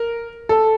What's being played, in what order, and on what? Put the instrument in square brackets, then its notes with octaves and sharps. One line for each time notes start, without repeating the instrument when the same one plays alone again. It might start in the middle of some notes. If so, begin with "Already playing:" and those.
Already playing: [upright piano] A#4
A4